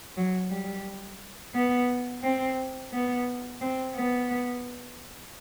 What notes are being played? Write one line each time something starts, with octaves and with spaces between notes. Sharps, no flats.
F#3
G3
B3
C4
B3
C4
B3